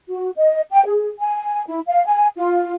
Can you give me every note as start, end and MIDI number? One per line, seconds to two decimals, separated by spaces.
0.08 0.30 66
0.36 0.62 75
0.71 0.84 79
0.86 1.10 68
1.20 1.63 80
1.68 1.80 64
1.87 2.05 77
2.06 2.28 80
2.37 2.73 65